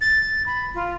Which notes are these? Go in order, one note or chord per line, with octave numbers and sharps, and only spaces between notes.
A6
B5
F4